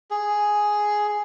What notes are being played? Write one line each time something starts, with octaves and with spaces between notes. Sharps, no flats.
G#4